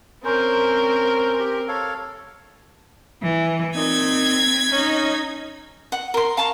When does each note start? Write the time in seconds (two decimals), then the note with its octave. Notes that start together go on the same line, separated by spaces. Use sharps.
0.25 C4 C#4 A#4 C5
1.39 G4
1.68 A4 C#5 F5
3.22 E3
3.75 A#2 C4 D#4 G#6 B6
4.72 C#4 D#4
5.92 F#5
6.14 A#4 C6
6.37 F5 A5 A#5 C#6